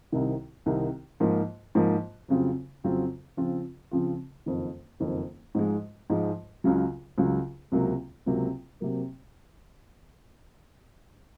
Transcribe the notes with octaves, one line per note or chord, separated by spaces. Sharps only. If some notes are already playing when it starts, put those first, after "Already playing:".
C2 C3 D#3
C2 C3 D#3
G#2 F3 A#3
G#2 F3 A#3
F2 C#3 F#3 C4 F4
F2 C#3 F#3 C4 F4
C#3 F3 C4 F4
C#3 F3 C4 F4
F#1 F2 D#3
F#1 F2 D#3
G#2 F3 G#3
G#2 F3 G#3
C#2 C#3 F#3
C#2 C#3 F#3
C#2 C3 F#3 A#3
C#2 C3 F#3 A#3
C3 F#3 A#3